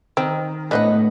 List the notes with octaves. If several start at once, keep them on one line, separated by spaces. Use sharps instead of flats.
D#3 C4
A2 A3 B3 D4 B4 C5 D#5 F#5